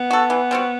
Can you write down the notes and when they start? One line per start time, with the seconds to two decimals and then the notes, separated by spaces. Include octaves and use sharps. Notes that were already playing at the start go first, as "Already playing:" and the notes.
Already playing: B3
0.11 F#4 A4
0.30 E3
0.51 G3 C4 F#4